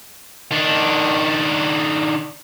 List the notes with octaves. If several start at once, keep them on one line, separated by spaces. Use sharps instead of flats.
D#3 D4